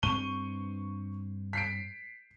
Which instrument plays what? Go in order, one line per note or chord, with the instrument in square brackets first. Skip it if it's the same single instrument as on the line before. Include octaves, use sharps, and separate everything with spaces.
[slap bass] G2 C4 [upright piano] C#6 D#7 G7
[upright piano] B6 C7 D7